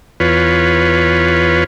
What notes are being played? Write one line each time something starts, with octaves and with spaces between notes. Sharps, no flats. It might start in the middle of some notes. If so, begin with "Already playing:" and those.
E2 F4 B4 C#5